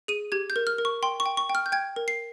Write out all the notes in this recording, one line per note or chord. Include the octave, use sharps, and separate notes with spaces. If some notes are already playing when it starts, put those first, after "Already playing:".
G#4 D#7
G4 G#6
G6
A#4
F6
A#4
C#6
G5 C6
C#6
G5
C#6
G5
F6
G6
G5 G#6
A#4
C7